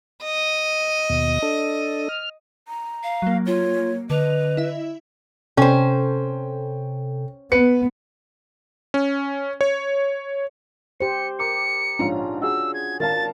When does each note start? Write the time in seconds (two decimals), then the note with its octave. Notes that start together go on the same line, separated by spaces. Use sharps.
0.23 D#5
1.09 D#2 B2
1.42 D4 A4
2.09 F6
2.68 A#5
3.03 F5
3.22 F#3 A#3
3.47 F4 C#5
4.10 D3 B4 D#5 F7
4.57 E4 E5
5.57 C3 C#4 A4 C5 G5
7.52 B3 B4 C#7
8.94 C#4
9.61 C#5
11.00 G4 C5 C#7
11.39 A#4 D6 C#7
11.99 A#1 G#2 C#4 D4 F4 A#5
12.42 F#4 G#4 E6
12.74 G#6
13.00 G#1 A#4 F5 A5 A6